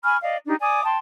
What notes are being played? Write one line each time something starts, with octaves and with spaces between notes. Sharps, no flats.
G#5 B5 C#6 F6
D5 D#5 F5
D4 D#4 G4
D5 G#5 D6 D#6
G5 A5 C6